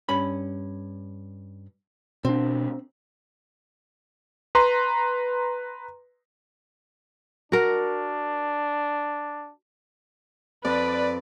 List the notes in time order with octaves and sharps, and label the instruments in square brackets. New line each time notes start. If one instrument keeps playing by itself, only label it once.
[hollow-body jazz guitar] G2 C#4 B5
[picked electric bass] B2 D4 [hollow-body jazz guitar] C4
[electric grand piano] B4 A#5 C6
[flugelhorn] D4 [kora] F#4 A#4
[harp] F2 [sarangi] B4 [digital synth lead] D5